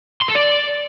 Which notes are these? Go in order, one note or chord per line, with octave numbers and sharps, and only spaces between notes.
C6
A4
D5